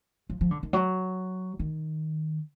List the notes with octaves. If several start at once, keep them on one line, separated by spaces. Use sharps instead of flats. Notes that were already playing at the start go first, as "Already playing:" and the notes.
F3
F3
D3
D#3
F#3
D#3